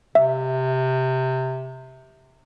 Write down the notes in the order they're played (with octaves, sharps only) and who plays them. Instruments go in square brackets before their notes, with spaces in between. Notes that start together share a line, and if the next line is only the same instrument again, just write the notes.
[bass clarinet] C3 [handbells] E5